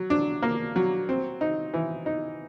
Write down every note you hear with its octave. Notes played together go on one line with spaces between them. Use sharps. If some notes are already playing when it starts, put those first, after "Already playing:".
Already playing: F#3
D4
A#3
F#3
C4
D#4
E3
D#4